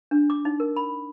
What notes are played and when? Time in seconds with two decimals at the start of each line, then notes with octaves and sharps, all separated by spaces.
0.11 D4
0.30 D6
0.45 D#4
0.60 A#4
0.76 B5